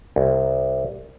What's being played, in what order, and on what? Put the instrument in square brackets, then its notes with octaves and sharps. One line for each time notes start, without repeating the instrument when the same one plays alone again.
[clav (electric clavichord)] C2